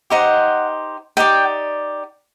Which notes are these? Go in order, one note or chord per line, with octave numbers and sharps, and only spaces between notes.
D#4 G4 C5 D#5 F#5
D#4 G4 D5 G5